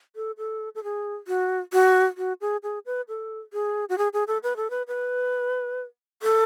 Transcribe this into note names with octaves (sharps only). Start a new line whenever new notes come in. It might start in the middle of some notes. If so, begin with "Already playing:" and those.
A4
A4
A4
G#4
F#4
F#4
F#4
G#4
G#4
B4
A4
G#4
F#4
G#4
G#4
A4
B4
A4
B4
B4
A4